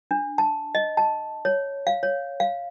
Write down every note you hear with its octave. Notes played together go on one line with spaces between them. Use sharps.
D4
A5
D#5
A5
C#5
F5
C#5
F5